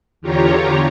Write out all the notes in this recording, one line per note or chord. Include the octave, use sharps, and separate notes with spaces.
E2 D3 F4 G4 C#5 A#5